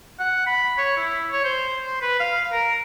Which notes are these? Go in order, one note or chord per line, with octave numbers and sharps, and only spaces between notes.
F#5
B5
C#5
E4
C#5
C5
C6
B4
F5
A#4